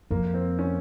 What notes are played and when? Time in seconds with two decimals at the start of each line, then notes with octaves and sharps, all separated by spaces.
0.11 F2 A#3
0.34 C4
0.59 C#4